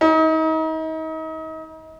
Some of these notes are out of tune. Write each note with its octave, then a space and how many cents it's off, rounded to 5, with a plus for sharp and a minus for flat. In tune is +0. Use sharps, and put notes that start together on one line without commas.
D#4 +35